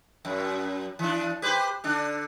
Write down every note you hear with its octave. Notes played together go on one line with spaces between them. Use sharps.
F#2
E3 D4
G4 B4 C5
D3 D4